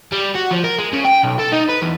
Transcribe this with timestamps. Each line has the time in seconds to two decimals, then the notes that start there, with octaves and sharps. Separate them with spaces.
0.12 G3
0.35 F#4
0.51 F3
0.64 A#4
0.78 G#3
0.93 C#3
1.05 G5
1.23 B1
1.39 A4
1.52 D#4
1.69 B4
1.82 E2